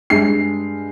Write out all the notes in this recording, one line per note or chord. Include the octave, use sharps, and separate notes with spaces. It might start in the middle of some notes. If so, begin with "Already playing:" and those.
G2 G#3 C7